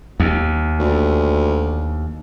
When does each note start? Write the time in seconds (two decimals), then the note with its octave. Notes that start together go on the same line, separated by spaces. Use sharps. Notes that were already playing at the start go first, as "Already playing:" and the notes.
0.20 D#2
0.79 D2